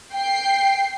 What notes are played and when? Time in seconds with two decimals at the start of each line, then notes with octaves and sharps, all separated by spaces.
0.14 G5 C7